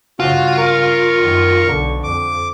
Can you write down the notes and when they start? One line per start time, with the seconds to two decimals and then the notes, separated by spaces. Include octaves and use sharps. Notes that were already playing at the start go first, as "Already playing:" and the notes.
0.20 G2 C#3 F4 F#4
0.58 A#4 C#6
1.19 F#2 D#3
1.65 B1 D3
2.03 F2 D6